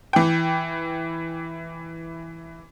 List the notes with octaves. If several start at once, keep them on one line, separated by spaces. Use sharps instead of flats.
E3 G5